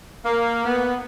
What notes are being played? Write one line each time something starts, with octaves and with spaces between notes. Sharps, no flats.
A#3
B3